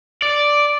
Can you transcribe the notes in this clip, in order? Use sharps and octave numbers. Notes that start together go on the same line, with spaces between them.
D5